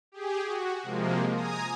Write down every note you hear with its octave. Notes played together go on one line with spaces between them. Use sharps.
G4 G#4
F#4
C3 F3 G#3 A#3
G#5 A#5 D#6